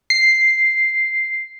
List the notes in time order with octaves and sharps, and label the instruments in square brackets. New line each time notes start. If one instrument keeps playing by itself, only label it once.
[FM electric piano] C7